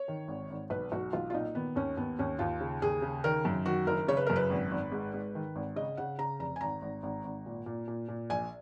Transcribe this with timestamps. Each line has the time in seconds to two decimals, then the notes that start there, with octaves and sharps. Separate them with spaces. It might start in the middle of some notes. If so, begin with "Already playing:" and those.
Already playing: C#5
0.08 D#3
0.28 G#1
0.50 G#1
0.70 B1 B4
0.92 B1 F#4
1.13 B1 F4
1.30 F4
1.33 A#2 D#4
1.55 D#3 B3
1.76 D#2 C#4
1.97 D#2 B3
2.19 D#2 C#4
2.39 D#2 F4
2.61 C#3
2.82 D#2 G#4
3.02 C#3
3.24 D#3 A#4
3.45 F#2
3.66 D#3 F#4
3.87 F#1 A#4
4.08 C#3 C#5
4.17 B4
4.26 F#2 A#4
4.36 B4
4.50 G#1
4.71 G#1
4.92 G#2
5.14 G#2
5.35 D#3
5.56 G#1
5.76 C#3 D#5
5.97 C#3 F#5
6.19 C#3 A#5
6.39 F1 A#5
6.56 G#5
6.61 G#1 A#5
6.82 G#1
7.03 G#1
7.24 G#1
7.46 A#2
7.66 A#2
7.88 A#2
8.08 A#2
8.30 A#1 G#5